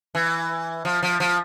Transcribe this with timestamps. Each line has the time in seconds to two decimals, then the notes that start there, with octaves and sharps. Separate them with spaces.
0.15 E3
0.85 F3
1.03 F3
1.20 F3